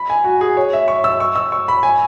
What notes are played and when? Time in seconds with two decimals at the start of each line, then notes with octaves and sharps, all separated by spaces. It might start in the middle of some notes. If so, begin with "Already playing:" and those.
Already playing: B5
0.10 G#5
0.24 F#4
0.41 G#4
0.57 C#5
0.73 E5
0.88 C#6
1.04 E6
1.20 C#6
1.36 E6
1.52 C#6
1.68 B5
1.83 G#5